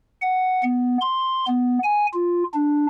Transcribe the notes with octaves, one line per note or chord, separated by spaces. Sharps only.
F#5
B3
C6
B3
G#5
F4
D4